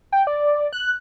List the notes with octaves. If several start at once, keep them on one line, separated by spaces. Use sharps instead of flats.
G5
D5
F#6